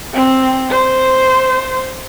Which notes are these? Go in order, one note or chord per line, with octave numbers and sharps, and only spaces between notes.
C4
C5